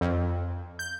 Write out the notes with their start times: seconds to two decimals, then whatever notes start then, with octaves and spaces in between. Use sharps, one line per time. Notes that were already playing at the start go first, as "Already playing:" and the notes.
0.01 F2
0.79 G6